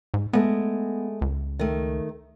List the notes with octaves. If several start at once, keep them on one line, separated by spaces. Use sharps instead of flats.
G#2
G#3 A3 B3
C#2
D#3 A3